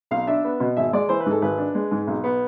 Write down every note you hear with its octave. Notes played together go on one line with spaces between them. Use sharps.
B1 F5
D4 E5
B3
B2
G#1 E5
G#3 D5
E3 C5
B4
G#2 A4
G#1 B4
D4
G#3
G#2
B1
B3